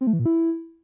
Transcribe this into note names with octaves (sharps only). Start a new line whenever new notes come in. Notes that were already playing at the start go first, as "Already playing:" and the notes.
C4
A3
E3
A#2
E4